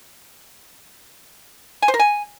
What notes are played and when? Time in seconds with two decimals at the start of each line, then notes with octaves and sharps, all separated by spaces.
1.82 G#5
1.88 C5
1.94 A#4
1.99 G#5